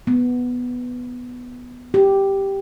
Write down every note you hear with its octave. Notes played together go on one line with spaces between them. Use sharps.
B3
G4